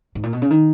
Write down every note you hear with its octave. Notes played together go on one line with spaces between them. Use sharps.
G#2
A#2
B2
C#3
D#3